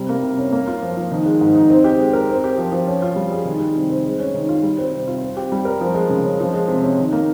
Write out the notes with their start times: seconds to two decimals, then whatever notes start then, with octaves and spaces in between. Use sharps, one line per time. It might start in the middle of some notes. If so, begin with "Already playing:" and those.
Already playing: C3 G3
0.09 A#3
0.23 C3
0.38 C#4
0.52 A#3
0.67 F4
0.83 F3
0.97 F3
1.11 D#3
1.26 G#3
1.41 G#2
1.55 D#4
1.70 C4
1.84 G4
1.99 G#3
2.13 A#4
2.29 C4
2.44 G4
2.58 F3
2.72 F3
2.87 C#4
3.02 F4
3.16 G3
3.32 G#4
3.45 D#3
3.60 G3
3.76 C3
3.90 C4
4.05 G#3
4.20 C#4
4.34 D#3
4.49 F4
4.63 G3
4.78 C4
4.93 C3
5.07 F4
5.21 C4
5.37 G4
5.52 G3
5.65 A#4
5.81 F3
5.95 G#3
6.09 C#3
6.24 C#4
6.40 F3
6.53 G#3
6.68 C3
6.83 C#4
6.98 D#3
7.13 A#3